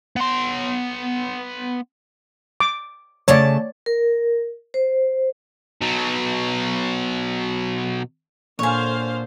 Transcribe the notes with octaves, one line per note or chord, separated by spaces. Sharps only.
B3 C6
D6
C#3 A3 C#5 D5 A5
A#4
C5
B2 F#3
A#2 D3 C5 C#5 F5 G#5